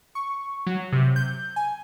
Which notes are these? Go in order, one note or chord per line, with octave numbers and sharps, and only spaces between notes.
C#6
F#3
C3
G6
G#5